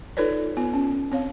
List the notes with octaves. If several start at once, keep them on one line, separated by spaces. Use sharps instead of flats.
D#4 F4 A4 B4 C#5 D5
B3 F4
C#4
C4 C#5 F5